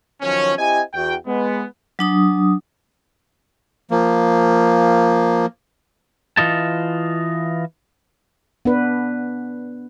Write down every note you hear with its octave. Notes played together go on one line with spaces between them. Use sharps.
D#3 F3 F#3 C#4
C4 E4 G4 D#5 G#5
E2 F#4 G5
G#3 B3
F#3 D4 D#6
F3 A#3
E3 F4 D#5 A5
B3 D4 B4